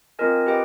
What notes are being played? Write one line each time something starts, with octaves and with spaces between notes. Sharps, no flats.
C4 F4 A#4 D#5 G#5
G4 B4 D#5 G5